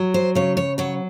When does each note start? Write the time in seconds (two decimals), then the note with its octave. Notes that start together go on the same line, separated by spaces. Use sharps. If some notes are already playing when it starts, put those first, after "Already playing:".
Already playing: F#3
0.14 C5
0.35 C#3 C#5
0.57 C#5
0.78 F#3 C#5